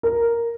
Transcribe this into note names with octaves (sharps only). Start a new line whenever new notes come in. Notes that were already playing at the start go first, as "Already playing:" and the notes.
A#4